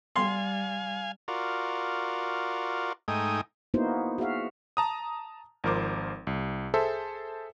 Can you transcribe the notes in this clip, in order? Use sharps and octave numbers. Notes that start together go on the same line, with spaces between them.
G3 F5 G#5 C6
F4 F#4 A#4 D5
G#2 A3 D#4 G5 G#5 D#6
A#3 B3 D#4 E4 F#4 C5
F#4 G#4 E5 F5
A5 A#5 D#6
G#1 F3 A#4 C5 D6
C2
G#4 A4 C5 E5